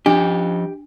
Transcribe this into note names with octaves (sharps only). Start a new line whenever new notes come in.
F3 D4 G4 D#5